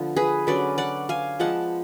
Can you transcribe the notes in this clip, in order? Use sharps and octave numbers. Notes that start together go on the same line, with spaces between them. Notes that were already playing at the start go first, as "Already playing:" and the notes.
Already playing: D3 F3 B3 F4
G#4 B4
D3 F#3 C#4 B4 D5
D5 F#5
F5 G#5
F3 G#3 B3 F#5 A5